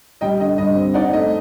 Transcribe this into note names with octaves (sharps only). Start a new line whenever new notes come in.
G3 D#5 G5
D3 D#5
G2 D#5
C4
D#4 D5 F#5
A3 D#5